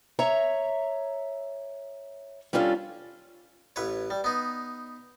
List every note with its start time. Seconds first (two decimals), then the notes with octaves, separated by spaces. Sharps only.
0.19 C#5 E5 A#5
2.53 G3 C#4 D4 F4 A4
3.76 A1 B4 C#5
4.10 G3
4.24 B3 D#4